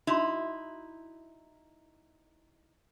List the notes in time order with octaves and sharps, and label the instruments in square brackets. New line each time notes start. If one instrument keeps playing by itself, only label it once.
[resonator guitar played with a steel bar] D#4 E4 [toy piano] F#4 E5 C6